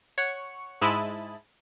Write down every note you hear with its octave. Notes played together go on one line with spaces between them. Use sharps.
C#5 F#5 C#6
G#2 G#3 E4 D#5 A5 B5